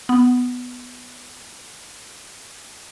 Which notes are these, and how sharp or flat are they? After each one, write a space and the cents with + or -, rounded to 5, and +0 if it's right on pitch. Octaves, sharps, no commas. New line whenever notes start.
B3 +5